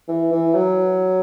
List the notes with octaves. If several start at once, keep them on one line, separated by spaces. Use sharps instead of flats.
E3
E3
F#3